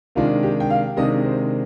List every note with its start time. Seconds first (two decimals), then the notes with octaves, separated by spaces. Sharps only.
0.15 C3 D#3 G#3 D4 F4
0.43 G4
0.60 G5
0.70 F5
0.96 C3 D#3 G#3 D4 D#5
1.25 C5